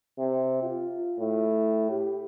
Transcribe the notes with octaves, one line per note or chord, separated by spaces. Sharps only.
C3
F4
A2
G4